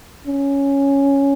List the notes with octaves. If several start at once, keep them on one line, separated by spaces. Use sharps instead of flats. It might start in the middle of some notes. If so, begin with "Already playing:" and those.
C#4